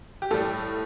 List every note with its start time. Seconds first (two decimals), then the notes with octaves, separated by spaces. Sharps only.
0.22 G4
0.31 A2 A4
0.34 G3